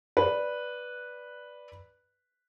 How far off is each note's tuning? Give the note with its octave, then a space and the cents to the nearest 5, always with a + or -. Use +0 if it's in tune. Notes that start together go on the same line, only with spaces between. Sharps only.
B4 -5 D5 +0